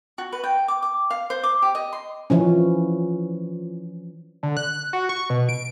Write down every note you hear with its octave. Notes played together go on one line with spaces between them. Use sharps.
F#4
B4
G5
D6
D6
F5
C5
D6
G4
D#5
C6
E3 F3 C#4
D3
F#6
F#4
C#6
B2
D7